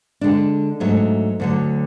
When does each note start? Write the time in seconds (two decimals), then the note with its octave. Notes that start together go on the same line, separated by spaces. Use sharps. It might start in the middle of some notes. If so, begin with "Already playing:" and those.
0.21 D3 G#3 D4
0.80 G#2 F#3 A3 D4
1.40 D2 D3 F#3